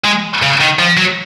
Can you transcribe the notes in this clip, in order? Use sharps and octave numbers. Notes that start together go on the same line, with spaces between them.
G#3
C#3
D#3
F3
F#3